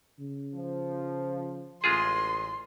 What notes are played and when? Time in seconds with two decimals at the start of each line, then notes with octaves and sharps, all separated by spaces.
0.19 C#3
0.54 F3
1.84 A1 G#3 F4 G#4 C6